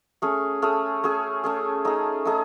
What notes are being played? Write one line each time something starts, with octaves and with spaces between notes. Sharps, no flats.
A3 C#4 G#4
A3 C#4 G#4
A3 C#4 G#4
A3 C#4 G#4
A3 D#4 G#4
A3 D#4 G#4